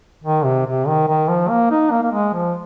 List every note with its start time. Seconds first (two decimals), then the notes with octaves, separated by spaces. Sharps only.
0.24 D#3
0.45 C3
0.66 C3
0.87 D#3
1.08 D#3
1.28 F3
1.49 A#3
1.71 D#4
1.91 A#3
2.03 A#3
2.12 G#3
2.34 F3